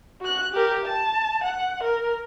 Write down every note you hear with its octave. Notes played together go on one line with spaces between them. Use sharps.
F#4 F#6
G4 A#4
A5
F#5
A#4